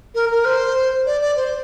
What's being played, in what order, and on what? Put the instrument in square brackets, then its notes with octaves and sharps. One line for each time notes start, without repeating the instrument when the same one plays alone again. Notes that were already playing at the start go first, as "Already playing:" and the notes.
[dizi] A#4
A#4
C5
D5
D5
C5